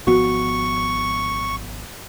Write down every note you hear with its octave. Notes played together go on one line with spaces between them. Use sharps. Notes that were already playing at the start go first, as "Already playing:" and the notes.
G#1 F3 B3 F#4 C#6